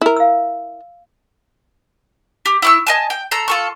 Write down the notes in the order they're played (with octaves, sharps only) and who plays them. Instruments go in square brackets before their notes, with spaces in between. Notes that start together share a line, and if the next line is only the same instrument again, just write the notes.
[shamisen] E4 A#4
[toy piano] F5 E6
[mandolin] G4
E4 C#6 E6
D#5 G#5 A5
G5
A4 A#5 C6
F4 A4 C#6